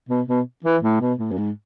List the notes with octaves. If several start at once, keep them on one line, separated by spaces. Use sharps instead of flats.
B2
B2
E3
A2
B2
A2
F#2
G#2